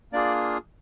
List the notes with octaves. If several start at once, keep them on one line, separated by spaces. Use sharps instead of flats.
A#3 D4 F4 G#4 D5